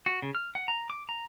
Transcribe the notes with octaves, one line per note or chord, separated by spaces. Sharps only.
F#4
C#3
F6
F#5
A#5
D6
A#5